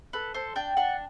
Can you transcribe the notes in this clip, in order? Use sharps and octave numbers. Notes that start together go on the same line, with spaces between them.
A4 B4
A4 C5
D4 G5
D4 F#5